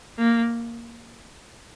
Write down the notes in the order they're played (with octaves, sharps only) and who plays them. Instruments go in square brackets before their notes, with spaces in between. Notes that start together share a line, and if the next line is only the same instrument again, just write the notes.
[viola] A#3